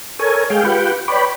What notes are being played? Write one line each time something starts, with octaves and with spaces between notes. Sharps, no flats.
A4 A#4 C#5 G#5
G#3 G#4 F5 G5
F4 G4 B4 F#5 G5
B4 C#5 D5 G5 B5